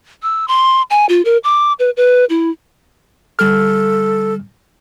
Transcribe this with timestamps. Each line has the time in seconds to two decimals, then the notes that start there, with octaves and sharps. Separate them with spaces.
0.23 E6
0.48 C6
0.90 G#5
1.09 F4
1.25 A#4
1.44 D6
1.79 B4
1.97 B4
2.30 E4
3.39 D3 G3 A4 F6